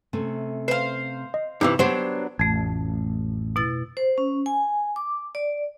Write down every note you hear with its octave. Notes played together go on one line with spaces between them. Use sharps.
C3 A3 C#4
B4 C5 F5
D#5
G2 C3 E3 D#4
F#3 B3 D4 G4 C5 C#5
A1 F2 A3
B2 E4 A6
C5
C#4
G#5
D6
D5